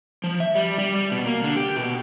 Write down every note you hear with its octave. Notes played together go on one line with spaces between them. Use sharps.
F3
E5
G3
G3
G3
B2
A#3
D3
G4
B2